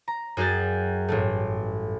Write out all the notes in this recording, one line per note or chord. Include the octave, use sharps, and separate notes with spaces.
A#5
F#2 F#4 G#4 G5 A6
A1 G2 A3